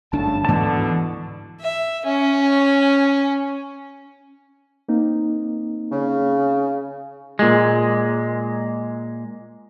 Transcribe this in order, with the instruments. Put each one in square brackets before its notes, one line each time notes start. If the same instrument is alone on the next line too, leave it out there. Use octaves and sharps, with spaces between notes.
[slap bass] G1 F#2 D4 [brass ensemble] A2 C#3 A5
[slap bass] D2 G#2 [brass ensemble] B2 D3 [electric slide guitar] E3 A5
[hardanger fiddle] E5
C#4
[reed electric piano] A#3 C4 D#4
[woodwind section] C#3
[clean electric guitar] A#2 G#3